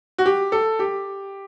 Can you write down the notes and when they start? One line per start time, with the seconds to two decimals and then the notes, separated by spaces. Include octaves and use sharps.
0.18 F#4
0.26 G4
0.52 A4
0.79 G4